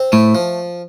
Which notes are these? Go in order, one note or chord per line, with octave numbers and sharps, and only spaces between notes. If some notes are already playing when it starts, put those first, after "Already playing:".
Already playing: C4
A2 A3
F3